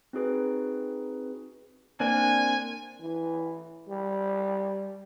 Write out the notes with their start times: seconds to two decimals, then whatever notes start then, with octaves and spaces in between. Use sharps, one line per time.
0.13 C4 D#4 F#4 G#4 B4
2.00 A#3 C4 D4 G#5
3.00 E3
3.89 G3